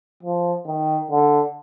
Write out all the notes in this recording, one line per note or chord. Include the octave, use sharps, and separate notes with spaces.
F3
D#3
D3